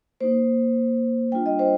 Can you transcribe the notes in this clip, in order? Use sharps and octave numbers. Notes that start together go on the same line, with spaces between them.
A#3 D#4 C5
G3 D4 F4 G5
D#5
C5